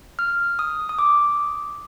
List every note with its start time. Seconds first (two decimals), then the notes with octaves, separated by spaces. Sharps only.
0.19 F6
0.59 D#6
0.89 D#6
0.99 D6